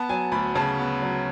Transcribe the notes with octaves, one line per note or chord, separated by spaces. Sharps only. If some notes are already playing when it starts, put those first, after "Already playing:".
Already playing: B3 A5
F#3 G#5
D2 B5
C#3 A5
B3
F#3